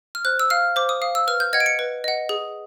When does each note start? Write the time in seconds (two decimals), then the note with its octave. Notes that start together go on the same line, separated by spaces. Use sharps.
0.15 F6
0.25 C5 F#6
0.39 E6
0.50 F5 F6
0.76 C5 D6
0.89 D#6
1.02 F5 D#6
1.15 E6
1.28 B4 F6
1.40 G6
1.53 D#5 F#5 G#6
1.60 D7
1.66 C#7
1.79 B4
2.04 D#5 F#5
2.29 G#4